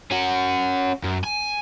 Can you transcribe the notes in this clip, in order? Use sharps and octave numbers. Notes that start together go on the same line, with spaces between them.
C#4 F#4
F#2
G#5